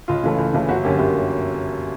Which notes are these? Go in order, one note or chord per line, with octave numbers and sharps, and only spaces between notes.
C#2 F4
C#3 E3 A3
C#2
C#3 E3 A3
G1 F#4
F#2 D3 F#3 A#3 G4
G1 G4